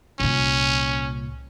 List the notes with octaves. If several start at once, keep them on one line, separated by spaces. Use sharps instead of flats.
C2 A#2 C#4